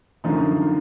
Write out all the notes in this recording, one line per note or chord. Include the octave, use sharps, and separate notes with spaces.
F#2 D3 F3 D#4